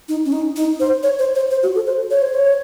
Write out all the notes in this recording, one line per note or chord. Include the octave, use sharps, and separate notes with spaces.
D#4
C#4
D#4
D#4
C5
C#5
C5
C5
C5
F#4
A4
C5
C#5
C5
C#5